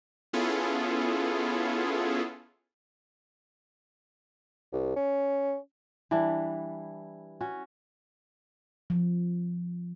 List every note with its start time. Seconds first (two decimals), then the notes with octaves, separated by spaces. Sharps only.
0.33 B3 C#4 E4 F4 G#4 A4
4.73 C2
4.96 C#4
6.11 E3 G3 D4 E4
7.41 C#4 F#4
8.90 F3